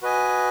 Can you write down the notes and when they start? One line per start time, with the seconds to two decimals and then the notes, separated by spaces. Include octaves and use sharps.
0.02 F#4 B4 D#5 G#5